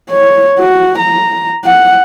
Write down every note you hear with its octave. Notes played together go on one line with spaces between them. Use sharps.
C#5
F#4
A#5
F#5